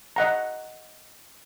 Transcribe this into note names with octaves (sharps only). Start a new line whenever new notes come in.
D#5 F#5 A#5